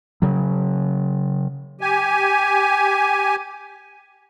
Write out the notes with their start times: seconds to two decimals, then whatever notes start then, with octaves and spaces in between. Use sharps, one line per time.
0.22 C#3 F#3
1.81 G4 G#5